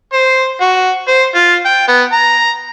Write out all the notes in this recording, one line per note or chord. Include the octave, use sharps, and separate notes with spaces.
C5
F#4
C5
F4
G5
B3
A#5